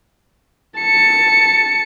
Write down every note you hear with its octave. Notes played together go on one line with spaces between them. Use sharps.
A5 C#7